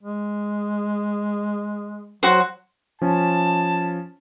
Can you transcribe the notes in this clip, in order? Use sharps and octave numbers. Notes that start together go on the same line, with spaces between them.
G#3
F#3 F#4 C5
F3 C#4 A5